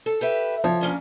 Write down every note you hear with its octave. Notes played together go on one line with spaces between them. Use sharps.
A4
G4 B4 E5
F3 C#5
A#3 C#4 D4